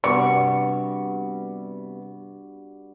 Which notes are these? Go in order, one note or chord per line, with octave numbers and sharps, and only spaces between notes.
G2 C3 G3 B3 F#4 D5 C#6 D6